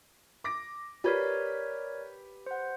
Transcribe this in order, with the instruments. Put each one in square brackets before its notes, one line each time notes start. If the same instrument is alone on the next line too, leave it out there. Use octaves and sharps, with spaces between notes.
[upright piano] D6 A#6 D7
[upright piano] G4 B4 [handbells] A#4 C#5 D5
[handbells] C5 F#5